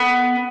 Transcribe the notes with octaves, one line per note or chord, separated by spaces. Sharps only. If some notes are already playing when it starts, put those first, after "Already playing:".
Already playing: B3